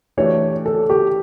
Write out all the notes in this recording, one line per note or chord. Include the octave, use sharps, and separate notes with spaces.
E3 A3 D4 G4 C#5
A4
G4